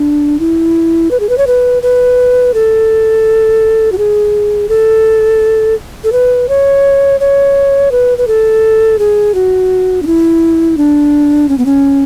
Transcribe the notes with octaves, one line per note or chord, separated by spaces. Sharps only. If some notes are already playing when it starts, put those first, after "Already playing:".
Already playing: D4
E4
B4
G#4
B4
C#5
B4
B4
A4
F#4
G#4
A4
A4
B4
C#5
C#5
B4
B4
A4
G#4
F#4
D4
E4
D4
C#4
B3
C#4